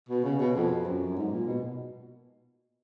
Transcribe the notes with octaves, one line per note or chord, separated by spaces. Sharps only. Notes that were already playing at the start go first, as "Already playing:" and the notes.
B2
C#3
B2
F2
F#2
G#2
A#2
B2